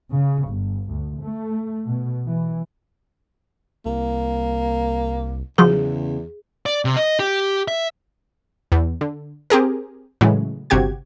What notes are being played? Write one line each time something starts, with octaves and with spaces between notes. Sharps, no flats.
C#3
G1
D2
A3
B2
E3
C2 A#3
E2 C#3 F3 F#3 G#4
D5
C3
D#5
G4
E5
E2
D3
C4 G4 G#4 A#4
A2 C#3 E3 F#3 G#3
G1 C3 F#4 G4 G#6